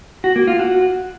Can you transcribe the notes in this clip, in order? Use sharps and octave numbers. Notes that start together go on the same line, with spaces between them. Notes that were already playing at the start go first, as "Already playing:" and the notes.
F#4
A#3
F4
F#4